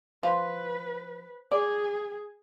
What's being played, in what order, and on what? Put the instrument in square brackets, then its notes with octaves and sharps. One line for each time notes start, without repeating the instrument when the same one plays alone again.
[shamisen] F3 [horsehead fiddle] B4
[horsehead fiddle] G#4 [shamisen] D5